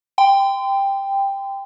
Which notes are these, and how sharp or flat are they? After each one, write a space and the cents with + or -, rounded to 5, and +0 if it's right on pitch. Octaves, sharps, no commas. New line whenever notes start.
G5 +10 C6 -35